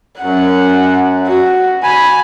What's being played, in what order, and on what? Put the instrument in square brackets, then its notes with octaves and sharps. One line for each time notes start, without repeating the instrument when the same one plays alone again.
[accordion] F#2 [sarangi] F#5
[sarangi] F#4
[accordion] G#5 [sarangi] B5